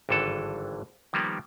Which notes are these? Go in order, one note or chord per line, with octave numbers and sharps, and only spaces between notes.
G#1 G2 D3 E3 A4
D#3 F3 G3 A#3 B3